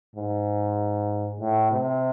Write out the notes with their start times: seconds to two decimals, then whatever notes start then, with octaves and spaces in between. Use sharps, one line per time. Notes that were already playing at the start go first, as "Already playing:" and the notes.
0.16 G#2
1.40 A2
1.71 C3